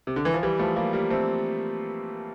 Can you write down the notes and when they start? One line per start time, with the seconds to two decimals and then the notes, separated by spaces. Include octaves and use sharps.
0.07 C3
0.16 D3
0.25 E3
0.34 F3
0.43 E3 G3
0.59 F3 A3
0.76 G3 A#3
0.93 G3 A#3
1.10 A3 C4